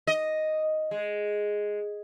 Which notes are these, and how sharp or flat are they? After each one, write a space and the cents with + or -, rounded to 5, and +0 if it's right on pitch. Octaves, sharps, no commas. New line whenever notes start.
D#5 +0
G#3 +0